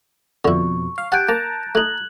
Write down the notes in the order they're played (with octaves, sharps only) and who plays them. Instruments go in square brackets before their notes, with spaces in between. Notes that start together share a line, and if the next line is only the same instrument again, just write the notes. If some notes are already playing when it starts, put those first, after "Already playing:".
[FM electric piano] F2 B2 [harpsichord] D3 E4 [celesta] C#6
[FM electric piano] F5
[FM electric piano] G4 A5 [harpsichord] F#5 G#5 [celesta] F#6 G6 D7
[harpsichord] A#3 [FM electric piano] A5 A#5
[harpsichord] A3 D#4 [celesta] F#6 G#6 F#7